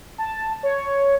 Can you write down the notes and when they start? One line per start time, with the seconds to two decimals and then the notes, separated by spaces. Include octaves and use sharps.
0.18 A5
0.63 C#5